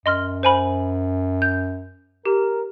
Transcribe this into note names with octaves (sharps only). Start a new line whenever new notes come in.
F#2 D#5 C6 F6
C5 G#5 B5
G6
G4 A#4